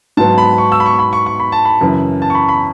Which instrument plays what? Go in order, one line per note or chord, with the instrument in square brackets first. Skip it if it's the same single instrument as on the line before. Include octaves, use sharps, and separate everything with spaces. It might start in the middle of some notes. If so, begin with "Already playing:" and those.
[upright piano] G#2 F#3 B3 [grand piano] A5
[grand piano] B5
C#6
E6
B5
C#6
B5
C#6
C#6
B5
A5
B5
[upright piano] F#2 C#3 E3
[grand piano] A5
C#6
B5
B5